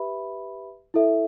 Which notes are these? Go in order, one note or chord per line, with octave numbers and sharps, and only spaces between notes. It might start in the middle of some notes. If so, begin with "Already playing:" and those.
Already playing: G4 B4 E5 B5
E4 A4 E5